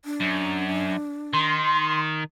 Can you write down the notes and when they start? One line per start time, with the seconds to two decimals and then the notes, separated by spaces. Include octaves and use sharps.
0.05 D4
0.21 F#2
1.34 D#3 C6